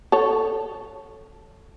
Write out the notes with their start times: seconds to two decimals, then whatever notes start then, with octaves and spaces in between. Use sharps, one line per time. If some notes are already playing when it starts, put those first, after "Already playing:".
0.12 A4 C#5